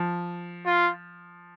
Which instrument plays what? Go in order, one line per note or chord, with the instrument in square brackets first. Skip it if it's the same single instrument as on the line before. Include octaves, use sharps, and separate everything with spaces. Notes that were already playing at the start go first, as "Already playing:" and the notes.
Already playing: [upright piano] F3
[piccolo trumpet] F4